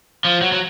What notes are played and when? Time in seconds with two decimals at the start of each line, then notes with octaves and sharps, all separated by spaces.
0.25 F3
0.42 F#3
0.52 F#3